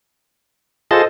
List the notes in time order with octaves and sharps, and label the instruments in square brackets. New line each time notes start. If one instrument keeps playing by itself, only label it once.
[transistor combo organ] F4 G#4 A5 [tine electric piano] A4 C5 D#5